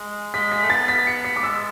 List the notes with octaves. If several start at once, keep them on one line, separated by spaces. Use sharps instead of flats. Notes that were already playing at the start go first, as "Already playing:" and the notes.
Already playing: G#3
G#3 B6
B6
A3
B3 A6
B6
C#7
B6
D6
G#3 E6